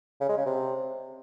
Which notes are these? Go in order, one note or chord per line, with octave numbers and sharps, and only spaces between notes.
C#3
G#3
C#3
C3